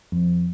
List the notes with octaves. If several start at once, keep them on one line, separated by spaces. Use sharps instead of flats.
F2